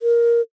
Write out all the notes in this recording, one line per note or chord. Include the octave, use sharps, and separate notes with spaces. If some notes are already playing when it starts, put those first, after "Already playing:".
A#4